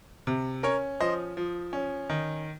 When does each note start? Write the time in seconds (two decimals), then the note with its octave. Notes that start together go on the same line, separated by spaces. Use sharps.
0.27 C3
0.63 C#4 A#4 C#5
1.01 F3 C5 D#5
1.37 F3
1.73 C#4
2.10 D#3